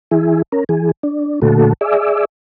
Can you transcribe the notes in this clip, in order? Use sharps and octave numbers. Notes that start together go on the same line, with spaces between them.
E3 E4 G#4
C#4 A#4
E3 G#4
D4
A#2 D3 A3 F#4 A4
G#4 D5 E5